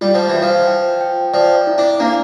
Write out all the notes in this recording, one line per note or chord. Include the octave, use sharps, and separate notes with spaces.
G3 F4
F3
E3
F4
F3
G5
G5
F3 D5
E4
D4
A#3 D4